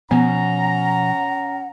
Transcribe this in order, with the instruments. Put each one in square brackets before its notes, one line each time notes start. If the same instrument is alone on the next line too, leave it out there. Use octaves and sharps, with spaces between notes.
[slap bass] B2 F3 [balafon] B3 [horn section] C#4 A#5 [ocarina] F#5